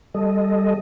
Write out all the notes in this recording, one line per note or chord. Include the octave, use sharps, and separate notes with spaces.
G3 A4 D#5